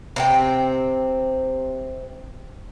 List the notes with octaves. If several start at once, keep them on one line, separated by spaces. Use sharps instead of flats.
C3 C4 G5